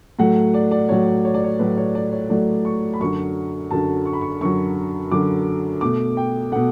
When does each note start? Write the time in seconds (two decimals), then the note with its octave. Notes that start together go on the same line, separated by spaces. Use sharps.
0.19 A2 F#3 A3 F#5
0.54 D5
0.71 D5
0.89 A2 F#3 A3 C#5
1.25 C#5
1.34 D5
1.44 C#5
1.59 A2 F#3 A3 B4
1.78 C#5
1.95 D5
2.12 C#5
2.30 A2 F#3 A3 D5
2.65 C#6
2.93 B5
3.00 F#2 D3 F#3 C#6
3.71 F#2 D3 F#3 A5
4.05 C#6
4.13 B5
4.21 C#6
4.41 F#2 D3 F#3 C#6
5.11 F#2 D3 F#3 D6
5.81 B2 A3 D6
6.17 G5
6.52 B2 A3 F#5